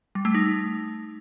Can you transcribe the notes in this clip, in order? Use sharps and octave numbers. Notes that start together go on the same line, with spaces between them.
G3
A3
D#4